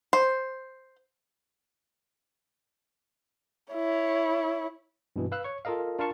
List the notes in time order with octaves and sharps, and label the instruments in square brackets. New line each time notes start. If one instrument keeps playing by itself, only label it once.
[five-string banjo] C5
[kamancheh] E4 C#5
[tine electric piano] G2 B2 E3
B4 F5 E6 F#6
C#5 C#6
F4 A4 A#4 D#5 F5
D4 F4 A#4 F5 A5 C#6